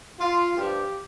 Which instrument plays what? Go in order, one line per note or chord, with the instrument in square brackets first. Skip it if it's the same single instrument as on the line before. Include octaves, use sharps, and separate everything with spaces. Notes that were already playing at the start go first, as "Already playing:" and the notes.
[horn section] F4
G2 F3 G4